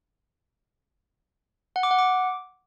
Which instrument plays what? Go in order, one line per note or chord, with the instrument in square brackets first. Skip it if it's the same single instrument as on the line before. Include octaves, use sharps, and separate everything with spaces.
[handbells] F#5
D6
F#5
D6